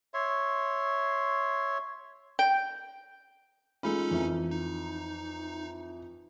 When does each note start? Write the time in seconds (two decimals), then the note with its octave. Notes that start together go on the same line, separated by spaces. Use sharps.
0.14 C#5 E5 C6
2.39 G5
3.83 G#3 C#4 D#4 F4 A4 B5
4.11 F2 E3
4.51 D#4